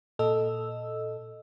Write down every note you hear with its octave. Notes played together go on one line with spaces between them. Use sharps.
A#2 A4 D#5 E6